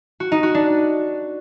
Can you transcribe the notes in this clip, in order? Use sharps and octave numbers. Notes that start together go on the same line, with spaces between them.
F#4
D#4
F#4
D4